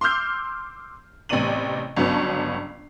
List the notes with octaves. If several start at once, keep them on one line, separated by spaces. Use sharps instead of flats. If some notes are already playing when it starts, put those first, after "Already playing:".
C6 D6 E6 F6 G6 C7
A1 C3 B3 D5 D#7 F#7
G1 C#2 F#3 B3 C#4 A5